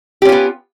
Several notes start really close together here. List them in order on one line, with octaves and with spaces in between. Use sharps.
G4 C#4 F4 B3